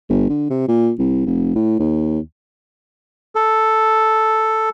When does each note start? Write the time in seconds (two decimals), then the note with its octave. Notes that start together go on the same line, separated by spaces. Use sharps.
0.09 G1
0.29 D3
0.50 C3
0.68 A#2
0.99 C2
1.26 F1
1.55 A2
1.79 D#2
3.35 A4